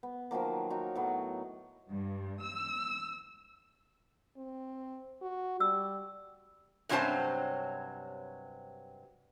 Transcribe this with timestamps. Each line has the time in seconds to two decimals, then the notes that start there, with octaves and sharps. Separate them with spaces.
0.03 B3
0.31 D#3 F3 F#3 A#3
0.70 D#4 F4 F#4 C#5
0.95 A2 F#3 B3
1.88 G2
2.42 E6
4.37 C4
5.22 F#4
5.60 G3 E6
6.89 G2 C3 F#3 C#4 C5 A5